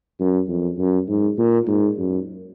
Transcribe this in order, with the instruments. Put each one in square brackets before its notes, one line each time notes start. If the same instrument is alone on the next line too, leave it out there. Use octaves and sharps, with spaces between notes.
[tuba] F#2
F2
F#2
G#2
A#2
G#2
F#2